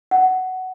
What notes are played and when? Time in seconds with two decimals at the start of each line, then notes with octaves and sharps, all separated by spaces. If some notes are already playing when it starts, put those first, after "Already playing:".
0.11 F#5